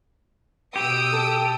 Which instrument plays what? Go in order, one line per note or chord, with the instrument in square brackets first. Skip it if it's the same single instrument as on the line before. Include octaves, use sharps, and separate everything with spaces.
[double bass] B2 [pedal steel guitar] G4 [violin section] D#6 E6 D7
[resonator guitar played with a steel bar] A4